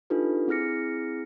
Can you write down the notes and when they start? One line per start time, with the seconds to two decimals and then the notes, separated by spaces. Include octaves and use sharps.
0.10 D4 D#4 F4 G4 A4 B4
0.48 C4 E4 G#4 F6 A#6 C#7